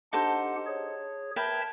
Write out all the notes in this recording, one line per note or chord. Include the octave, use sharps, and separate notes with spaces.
D4 D#4 G4 A4 C5 F#5
G#4 C#5
A#4 B4 E5 G5 A5 G#6